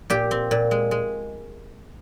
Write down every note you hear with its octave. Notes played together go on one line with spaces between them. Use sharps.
A#2 G4
C4
A#2
G#3
G#3